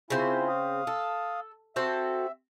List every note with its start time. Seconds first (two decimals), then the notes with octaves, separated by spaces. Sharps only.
0.10 C#3 C4 E4 F4 C5 G#5
0.48 F5 D#6
0.87 A4
1.76 C4 F#4 A4 E5